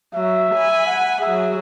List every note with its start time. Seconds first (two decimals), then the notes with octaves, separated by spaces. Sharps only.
0.14 F#3 E5
0.55 G#5 B5
0.86 F#5
1.21 F#3 G#4 E5